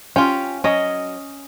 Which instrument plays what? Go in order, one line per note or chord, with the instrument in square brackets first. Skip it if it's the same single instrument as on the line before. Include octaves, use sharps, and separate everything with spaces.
[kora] C#4 [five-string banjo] F4 G4
[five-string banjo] F#3 [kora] C#4 D#5